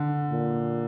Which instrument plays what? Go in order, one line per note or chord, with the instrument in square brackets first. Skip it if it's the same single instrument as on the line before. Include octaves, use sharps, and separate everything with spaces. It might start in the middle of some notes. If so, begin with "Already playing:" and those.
Already playing: [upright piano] D3
[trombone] A#2